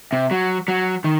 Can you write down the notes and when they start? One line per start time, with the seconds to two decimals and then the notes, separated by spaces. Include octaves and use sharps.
0.13 C3
0.31 F#3
0.68 F#3
1.04 D#3